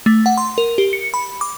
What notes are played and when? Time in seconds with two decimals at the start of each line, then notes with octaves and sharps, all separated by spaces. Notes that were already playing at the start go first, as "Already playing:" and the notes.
0.06 A3
0.26 F#5
0.38 C6
0.58 A#4
0.78 G4
0.93 C#7
1.14 B5
1.41 D6